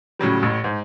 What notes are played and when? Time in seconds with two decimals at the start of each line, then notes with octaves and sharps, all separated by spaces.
0.19 A2 C#3 F#3 G3
0.42 A1 A2
0.64 G#2